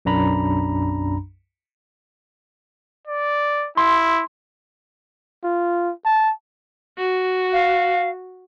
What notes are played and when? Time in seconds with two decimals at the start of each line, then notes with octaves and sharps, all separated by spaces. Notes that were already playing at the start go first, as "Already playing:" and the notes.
0.05 B1 F#2 D4 A#5 B5
3.07 D5
3.77 E4 C6
5.44 F4
6.05 A5
6.98 F#4
7.53 F5